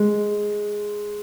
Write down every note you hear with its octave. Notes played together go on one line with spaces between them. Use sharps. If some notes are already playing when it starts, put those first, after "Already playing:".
Already playing: G#3